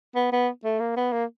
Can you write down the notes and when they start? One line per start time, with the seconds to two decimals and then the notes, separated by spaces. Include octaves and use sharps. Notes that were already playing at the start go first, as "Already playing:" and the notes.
0.15 B3
0.32 B3
0.64 A3
0.80 A#3
0.96 B3
1.12 A#3